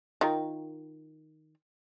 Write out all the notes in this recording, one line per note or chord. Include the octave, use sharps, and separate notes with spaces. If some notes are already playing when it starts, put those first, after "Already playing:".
D#3 F4 A#4